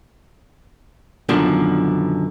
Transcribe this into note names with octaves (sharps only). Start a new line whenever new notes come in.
F#2 B2 D3 D#3 F3 D4